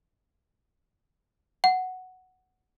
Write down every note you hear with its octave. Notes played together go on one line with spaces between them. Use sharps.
F#5